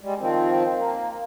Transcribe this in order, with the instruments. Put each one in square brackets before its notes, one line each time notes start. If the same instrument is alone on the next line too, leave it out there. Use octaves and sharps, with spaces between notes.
[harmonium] G3 G#3
D#3 F3 C4
A#3